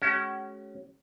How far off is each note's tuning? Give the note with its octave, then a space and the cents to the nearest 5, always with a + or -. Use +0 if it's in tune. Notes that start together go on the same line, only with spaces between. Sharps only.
G#3 +40 C#4 +0 F#4 +45